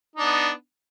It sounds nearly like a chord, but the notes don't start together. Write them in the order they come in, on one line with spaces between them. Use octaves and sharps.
D#4 D4 B3